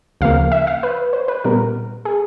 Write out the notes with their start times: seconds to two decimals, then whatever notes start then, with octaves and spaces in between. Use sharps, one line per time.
0.21 D2 C#3 F3 A#3 F5
0.52 E5
0.67 F5
0.83 B4
1.13 C5
1.28 B4
1.44 A#2 G3 B3 A#4
2.05 G#4